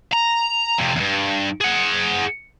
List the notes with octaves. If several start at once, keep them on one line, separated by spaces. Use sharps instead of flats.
A#5
F2 C3
E2 G2
G#4 F#5